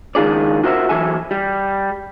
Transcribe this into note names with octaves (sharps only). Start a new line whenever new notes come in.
C#2 D#3 F4 G#4 D5
F4 F#4 A#4 C5 E5
E3 F#3 A4 E5 G#5
G3